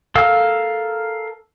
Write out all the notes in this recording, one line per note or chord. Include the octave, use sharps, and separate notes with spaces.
A4 A#4 F5 E6